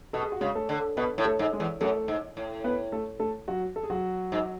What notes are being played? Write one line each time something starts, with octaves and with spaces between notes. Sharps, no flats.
B2 A4
G#4
F#4
C#3 G#3 G#4
A3 A4
D3
B2 B3 B4
A2
A3 A4
G#2
G#3 G#4
E2
F#2 A3 A4
G#2
A2
B3 B4
A3 A4
A3 A4
F#3 F#4
A4
G#4
F#3 F#4
G#2